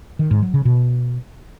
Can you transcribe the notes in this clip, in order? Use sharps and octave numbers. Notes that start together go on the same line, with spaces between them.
D#3
G#2
F#3
C#3
B2